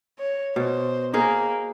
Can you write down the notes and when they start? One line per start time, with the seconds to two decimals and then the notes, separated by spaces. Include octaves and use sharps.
0.19 C#5
0.56 B2 C5
1.14 A#3 D#4 G#4 A#4